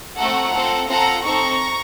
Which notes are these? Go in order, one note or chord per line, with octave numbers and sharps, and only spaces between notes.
A3 C4 F#4 A4 F#5 A#5
C4 F4 A4
C4 F4 A4 F#5 A#5
C4 D#4 A4 A#5 C#6